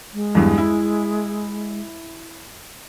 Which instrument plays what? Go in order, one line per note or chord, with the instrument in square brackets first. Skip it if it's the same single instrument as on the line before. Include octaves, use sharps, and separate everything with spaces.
[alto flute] G#3
[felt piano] E2 G2
E4